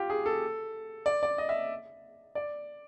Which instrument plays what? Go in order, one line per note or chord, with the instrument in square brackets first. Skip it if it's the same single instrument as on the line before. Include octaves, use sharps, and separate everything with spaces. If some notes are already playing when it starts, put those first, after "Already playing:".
Already playing: [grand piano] F4 G4
G#4
A4
D5
D5
D#5
E5
D5